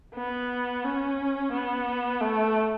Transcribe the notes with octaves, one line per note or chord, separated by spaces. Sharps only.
B3
C#4
B3
A3